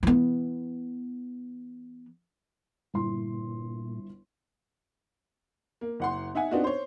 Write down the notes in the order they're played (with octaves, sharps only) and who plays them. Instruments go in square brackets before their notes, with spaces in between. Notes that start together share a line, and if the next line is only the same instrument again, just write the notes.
[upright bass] E3 B3
[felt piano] G1 E4 C6 [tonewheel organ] A#2
[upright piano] A#3
F#1 F#5 C6
D#4 E5 F#5 G#5
B3 C4 D4 D#4 F4 F#4
C5 C#5